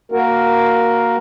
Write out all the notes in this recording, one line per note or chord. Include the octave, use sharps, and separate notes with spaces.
A#3 F#4 A#4